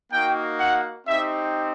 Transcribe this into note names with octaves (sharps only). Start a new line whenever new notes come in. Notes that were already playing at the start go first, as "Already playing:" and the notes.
A#3 D#4 F#4 G5
F#5
C4 D#4 G4 E5